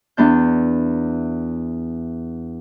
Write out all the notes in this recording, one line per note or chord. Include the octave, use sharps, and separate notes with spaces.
E2 B3 D4 G6